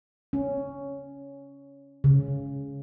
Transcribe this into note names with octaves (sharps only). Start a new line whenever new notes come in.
C#4
C#3